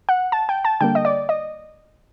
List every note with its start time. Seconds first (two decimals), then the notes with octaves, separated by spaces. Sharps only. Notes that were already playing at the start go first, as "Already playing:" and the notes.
0.09 F#5
0.32 A5
0.49 G5
0.65 A5
0.81 D3 G3 A#3 G5
0.95 D#5
1.05 D5
1.29 D#5